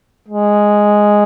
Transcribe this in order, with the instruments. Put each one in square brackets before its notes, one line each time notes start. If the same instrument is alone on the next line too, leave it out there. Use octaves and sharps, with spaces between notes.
[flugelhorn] G#3